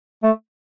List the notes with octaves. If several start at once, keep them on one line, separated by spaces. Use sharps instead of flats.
A3